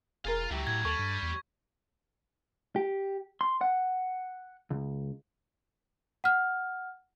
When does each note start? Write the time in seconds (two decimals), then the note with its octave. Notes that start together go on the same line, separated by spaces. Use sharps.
0.25 E1 F4 G#4 A#4 F5
0.50 C#2 D3 F#3 E4 G4
0.67 A2 G#6
0.85 D#2 G3 A4 C#6
0.99 G2
1.22 E2
2.76 G4
3.41 C6
3.61 F#5
4.71 C#2
6.24 F#5 F6